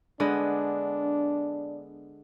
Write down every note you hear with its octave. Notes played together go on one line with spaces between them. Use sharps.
D3 G#3 B3 D4